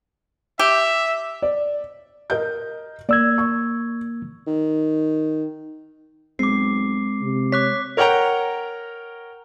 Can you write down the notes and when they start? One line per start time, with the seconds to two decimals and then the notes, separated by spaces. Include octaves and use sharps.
0.59 G4 E5
1.42 D5
2.30 A#4 D#5 G6
3.09 A#3 D5 E6 G#6
3.38 C#6
4.47 D#3
6.39 B1 G#3 C4 D6 C7
7.21 C3
7.52 C#5 D6 F#6 B6
7.97 A#4 C#5 F#5 G5 A#5